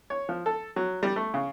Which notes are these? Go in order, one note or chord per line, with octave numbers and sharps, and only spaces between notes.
C#5
F3
A4
F#3
G3
A3
C#3